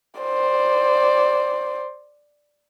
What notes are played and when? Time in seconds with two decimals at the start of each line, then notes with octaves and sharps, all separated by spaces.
0.20 C5 D5